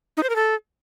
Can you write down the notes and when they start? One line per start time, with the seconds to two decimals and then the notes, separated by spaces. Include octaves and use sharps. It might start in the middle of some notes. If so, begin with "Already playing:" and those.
0.17 D#4
0.23 C5
0.29 A#4
0.36 A4